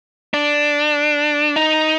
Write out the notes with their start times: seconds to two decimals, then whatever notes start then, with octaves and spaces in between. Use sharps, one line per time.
0.34 D4
1.56 D#4